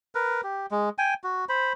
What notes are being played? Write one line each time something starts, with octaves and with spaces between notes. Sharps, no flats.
A#4 B4
G4
G#3
G5 G#5
F#4
C5 B5